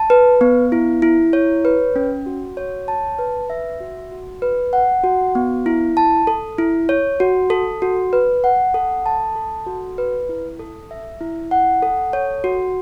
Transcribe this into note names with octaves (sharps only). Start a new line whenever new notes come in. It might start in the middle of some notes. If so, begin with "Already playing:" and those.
Already playing: A5
B4
B3
E4
E4
C#5
B4
C#4
F#4
C#5
A5
B4
E5
F#4
F#4
B4
F#5
F#4
B3
E4
A5
A4
E4
C#5
F#4
A4
F#4
B4
F#5
A4
A5
A4
F#4
B4
E4
A4
E5
E4
F#5
A4
C#5
F#4